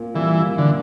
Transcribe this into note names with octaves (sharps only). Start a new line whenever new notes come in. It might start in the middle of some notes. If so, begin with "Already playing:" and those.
Already playing: A#2
E3 G3
A#3
D3